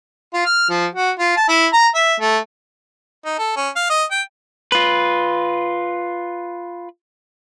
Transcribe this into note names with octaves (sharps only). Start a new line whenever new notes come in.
F4
F6
F3
F#4
F4
A5
E4
A#5
E5
A3
D#4
A4
C#4
F5
D#5
G5
F4 B4